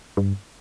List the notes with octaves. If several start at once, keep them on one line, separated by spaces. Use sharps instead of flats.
G2